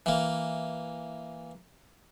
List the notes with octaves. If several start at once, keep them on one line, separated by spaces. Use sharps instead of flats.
E3 A#3